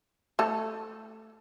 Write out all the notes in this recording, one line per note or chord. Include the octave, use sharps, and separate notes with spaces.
A3 A4